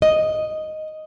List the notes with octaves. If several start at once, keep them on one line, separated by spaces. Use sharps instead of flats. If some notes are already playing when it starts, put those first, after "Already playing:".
D#5